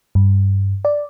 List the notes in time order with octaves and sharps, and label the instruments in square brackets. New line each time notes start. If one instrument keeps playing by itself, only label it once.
[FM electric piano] G2
D5